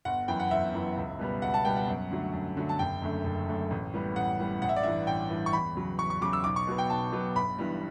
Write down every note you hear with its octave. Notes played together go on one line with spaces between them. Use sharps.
G1 F#5
F#2 E3 B3 G5
F#5
G1 E5
F#2 E3 B3
C#2
B2 G3 B3
C#2 F#5
A5
B2 G3 B3 G5
F#5
F#2
D3 F#3 A3
F#2
D3 F#3 A3
A5
F#1 G5
F#2 D3 A3
F#1
F#2 D3 A3
A1
A2 G3 B3
A1 F#5
A2 G3 B3
A1 F#5
E5
D5
G2 E3 E5
A1 G5
G2 E3
C#6
E2 B5
C#3 F#3
E2 C#6
C#6
C#3 F#3 D6
E6
B1 D6
C#6
B2 F#3 B3
G5
B1 A5
B2 F#3 B3
G1 B5
G2 E3 G3